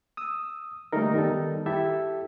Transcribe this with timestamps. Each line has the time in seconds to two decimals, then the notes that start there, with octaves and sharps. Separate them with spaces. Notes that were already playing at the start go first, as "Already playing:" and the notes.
0.17 D#6 E6
0.93 D3 G3 A3 A#3 D#4 A#4
1.14 D#3 G3 B3 D#4 A4
1.66 E4 G4 A4 E5